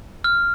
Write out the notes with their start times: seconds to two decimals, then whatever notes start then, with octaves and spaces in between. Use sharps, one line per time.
0.24 F6